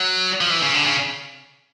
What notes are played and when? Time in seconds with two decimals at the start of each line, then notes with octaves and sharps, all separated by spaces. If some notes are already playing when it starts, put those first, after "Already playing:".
Already playing: F#3
0.41 F3
0.50 E3
0.63 C#3
0.74 D3
0.86 C#3